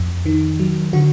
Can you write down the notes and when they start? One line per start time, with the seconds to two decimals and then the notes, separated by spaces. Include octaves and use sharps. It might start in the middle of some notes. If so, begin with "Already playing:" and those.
Already playing: F2
0.26 D#3
0.60 F#3
0.93 D3 F#4